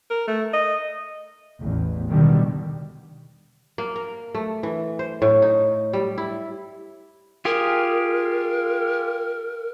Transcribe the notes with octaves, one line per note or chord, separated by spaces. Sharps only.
A#4
A3
D#5
A1 E2
B2 D3 D#3 G3
A#3
A#4
A3
E3
C5
A2
D#4
G3
E4
F4 G4 G#4 A#4